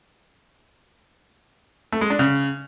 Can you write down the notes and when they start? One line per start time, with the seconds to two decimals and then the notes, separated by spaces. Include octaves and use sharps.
1.92 A3
2.01 G#3
2.10 D4
2.19 C#3